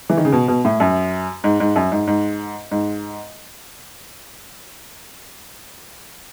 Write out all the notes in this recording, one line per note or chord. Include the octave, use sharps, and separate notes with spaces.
E3
D#3
C#3
B2
B2
A2
F#2
G#2
G#2
F#2
G#2
G#2
G#2